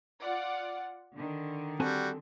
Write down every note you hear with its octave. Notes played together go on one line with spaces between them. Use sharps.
F4 D5 F#5
D3 D#3
G3 C4 F#4 A4 G#5